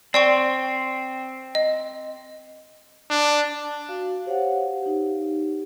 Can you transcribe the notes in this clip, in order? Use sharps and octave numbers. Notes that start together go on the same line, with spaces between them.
C4 D5 G5 C#6
D#5
D4
F#4 F5
G4 C5 C#5 F5 F#5
D#4 G4